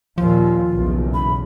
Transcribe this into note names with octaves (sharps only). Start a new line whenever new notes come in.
D#2 A#2 F3 F4
F#1 B1 E2
B5